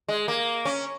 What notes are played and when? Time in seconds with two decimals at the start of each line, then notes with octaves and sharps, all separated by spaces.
0.08 G#3
0.28 A#3
0.65 C#4